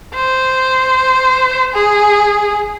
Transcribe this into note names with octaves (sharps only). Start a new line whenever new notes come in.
C5
G#4